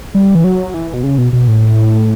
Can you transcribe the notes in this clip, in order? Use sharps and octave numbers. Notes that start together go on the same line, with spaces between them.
G3
E3
F#3
E3
B2
C#3
B2
B2
A2